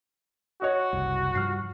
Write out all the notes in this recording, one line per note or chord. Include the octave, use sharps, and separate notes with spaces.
F#4 C#5 D#5
F#1 C2
G2 F3 F6 C7